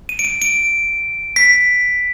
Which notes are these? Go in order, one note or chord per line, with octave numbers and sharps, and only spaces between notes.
D#7
D7
D#7
D7
B6